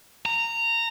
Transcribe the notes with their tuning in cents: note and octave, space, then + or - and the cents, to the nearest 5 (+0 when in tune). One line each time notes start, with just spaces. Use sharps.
A#5 -15